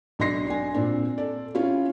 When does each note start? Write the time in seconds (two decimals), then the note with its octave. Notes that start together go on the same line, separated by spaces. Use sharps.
0.19 B1 D4 D#5 C6 A#6 C7
0.47 D4 G#5
0.74 A#2 C4 D4
1.18 A4 D5
1.55 C#4 E4 F4